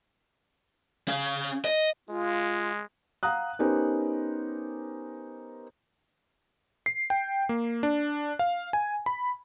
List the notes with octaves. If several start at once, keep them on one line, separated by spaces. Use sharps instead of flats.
C#4 F5
D#5
G#3 F4
F5 F#5 A#5 D#6 F#6
B3 C#4 D#4 G4 A#4 C5
C7
G5
A#3
D4
F5
G#5
B5